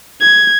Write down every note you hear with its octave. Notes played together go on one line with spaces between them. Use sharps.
G#6